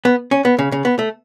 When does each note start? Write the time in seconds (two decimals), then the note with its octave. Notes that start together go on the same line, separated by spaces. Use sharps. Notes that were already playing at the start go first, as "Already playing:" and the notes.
0.05 B3
0.31 C#4
0.45 B3
0.59 C#3
0.72 C#3
0.85 B3
0.99 A3